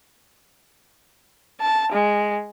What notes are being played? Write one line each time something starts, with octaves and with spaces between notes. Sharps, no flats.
A5
G#3